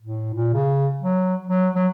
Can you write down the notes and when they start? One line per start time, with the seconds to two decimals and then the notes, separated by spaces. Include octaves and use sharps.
0.02 A2
0.34 A#2
0.54 C#3
1.01 F#3
1.47 F#3
1.75 F#3